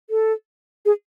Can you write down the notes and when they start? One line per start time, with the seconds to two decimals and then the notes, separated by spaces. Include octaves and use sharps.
0.10 A4
0.85 G#4